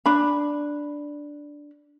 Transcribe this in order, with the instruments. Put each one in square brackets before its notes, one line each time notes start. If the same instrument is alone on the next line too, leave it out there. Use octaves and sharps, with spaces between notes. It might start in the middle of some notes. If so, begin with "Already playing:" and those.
[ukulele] D4 B5